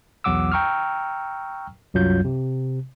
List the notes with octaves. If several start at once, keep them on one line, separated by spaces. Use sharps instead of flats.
B1 E2 F#3 F#5 D6 E6
G5 A#5 C#6 E6 F6
C2 F#2 F#3 F4 G6
C3